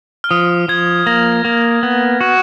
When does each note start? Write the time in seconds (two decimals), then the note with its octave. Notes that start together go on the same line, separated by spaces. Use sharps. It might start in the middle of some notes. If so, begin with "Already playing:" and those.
0.24 F6
0.31 F3 D#6
0.68 F3 G#6
1.06 A#3 A#6
1.45 A#3
1.83 B3
2.21 F#4